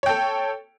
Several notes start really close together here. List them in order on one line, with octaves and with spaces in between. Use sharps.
C#5 G5 A4